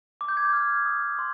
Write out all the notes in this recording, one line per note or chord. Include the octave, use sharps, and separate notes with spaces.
D6
G6
G#6
G6
F6
D#6
C6